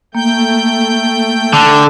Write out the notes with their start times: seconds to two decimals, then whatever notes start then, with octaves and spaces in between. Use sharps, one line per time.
0.15 A3 A#3 G5 G6
1.53 D3 A5